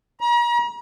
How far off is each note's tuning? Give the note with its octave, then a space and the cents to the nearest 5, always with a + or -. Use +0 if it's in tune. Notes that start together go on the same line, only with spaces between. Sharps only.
A#5 +40